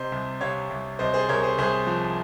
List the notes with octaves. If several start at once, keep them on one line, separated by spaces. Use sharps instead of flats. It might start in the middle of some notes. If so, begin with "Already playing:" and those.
Already playing: C3 C5 D#5
C2
C3 C#5 F5
C2
C2 C5 D#5
G#4 C5
C2 A#4 C#5
G#4 C5
C2 G#4 C5
F3